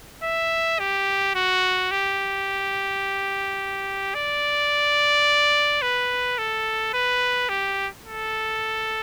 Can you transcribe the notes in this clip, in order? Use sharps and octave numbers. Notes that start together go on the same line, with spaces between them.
E5
G4
F#4
G4
D5
B4
A4
B4
G4
A4